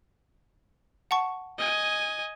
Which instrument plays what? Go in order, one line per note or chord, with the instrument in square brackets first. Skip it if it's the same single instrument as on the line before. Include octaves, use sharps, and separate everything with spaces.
[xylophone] F#5 A5 C#6
[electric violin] D#5 G#5